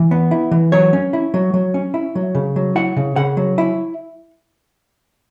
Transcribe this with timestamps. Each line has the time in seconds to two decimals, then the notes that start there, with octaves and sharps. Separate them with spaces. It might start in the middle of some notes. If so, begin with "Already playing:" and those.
Already playing: E3
0.11 B3
0.31 E4
0.51 E3
0.72 F#3 C#5
0.93 C#4
1.13 E4
1.34 F#3
1.54 F#3
1.74 C#4
1.94 E4
2.15 F#3
2.35 C#3
2.56 F#3
2.75 E4 F#5
2.96 C#3
3.16 C#3 F#5
3.37 F#3
3.58 E4